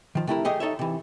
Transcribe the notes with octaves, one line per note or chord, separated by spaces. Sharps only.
D#3 F3
C3 A3 E4 A#4
A3 G4 G#4 D#5
D#4 A4 C#5 E5
C3 E3